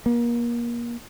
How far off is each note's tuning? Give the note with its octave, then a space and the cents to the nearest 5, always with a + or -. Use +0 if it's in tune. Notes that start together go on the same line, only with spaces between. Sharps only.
A#3 +30